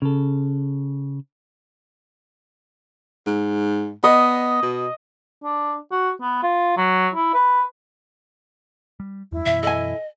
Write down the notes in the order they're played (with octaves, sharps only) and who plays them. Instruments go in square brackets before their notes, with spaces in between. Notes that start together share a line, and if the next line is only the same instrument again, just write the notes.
[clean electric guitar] C#3 A4
[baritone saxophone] G#2
[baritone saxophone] B3 [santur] D#5
[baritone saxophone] B2
[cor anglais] D4
F#4
B3
F4
F#3
E4
B4
[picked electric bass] G3
[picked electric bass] E2 G2 [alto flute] E4
[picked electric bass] F#2 B2 E3 [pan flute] E5
[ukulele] A4 G#5 [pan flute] D#5